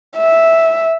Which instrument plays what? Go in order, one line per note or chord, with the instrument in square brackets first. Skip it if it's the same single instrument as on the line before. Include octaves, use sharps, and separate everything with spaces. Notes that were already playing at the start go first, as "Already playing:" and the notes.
[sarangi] E5